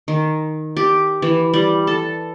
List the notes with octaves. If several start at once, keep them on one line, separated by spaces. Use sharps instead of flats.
D#3
G4
E3
G3
A4